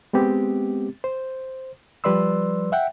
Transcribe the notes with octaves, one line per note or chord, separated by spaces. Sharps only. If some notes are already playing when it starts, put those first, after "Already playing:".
G#3 B3 C4 G4
C5
F3 G3 B4 D5 C6 E6
E5 F#5 G5